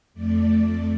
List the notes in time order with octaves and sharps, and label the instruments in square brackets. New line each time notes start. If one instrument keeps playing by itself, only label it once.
[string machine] F2 A3 D5